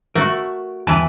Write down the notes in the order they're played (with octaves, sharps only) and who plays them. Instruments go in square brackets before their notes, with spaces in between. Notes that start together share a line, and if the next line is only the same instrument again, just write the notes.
[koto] A3 F#4 [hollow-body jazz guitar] A#4
[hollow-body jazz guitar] E2 G5 A5 [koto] E3 B4